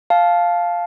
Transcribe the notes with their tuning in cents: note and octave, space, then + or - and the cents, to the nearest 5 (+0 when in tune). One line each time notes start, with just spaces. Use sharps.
F5 +0 A5 -15